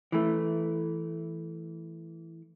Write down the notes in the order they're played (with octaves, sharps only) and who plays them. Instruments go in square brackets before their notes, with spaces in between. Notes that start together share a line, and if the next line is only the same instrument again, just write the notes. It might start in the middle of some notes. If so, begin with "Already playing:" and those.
[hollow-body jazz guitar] E3 A3